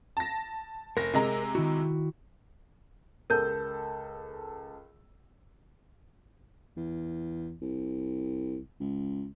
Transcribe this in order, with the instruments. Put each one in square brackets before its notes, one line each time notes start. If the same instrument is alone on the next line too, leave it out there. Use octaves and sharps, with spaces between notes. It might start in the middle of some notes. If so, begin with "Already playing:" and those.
[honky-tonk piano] A5 A#6
[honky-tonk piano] F1 A#6 [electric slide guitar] A#4
[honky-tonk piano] C3 G#3 A#5
[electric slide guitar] D#3 E4 F#4
[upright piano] C#2 A4 E6 [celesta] A#4 G6
[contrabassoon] E2
C2
C#2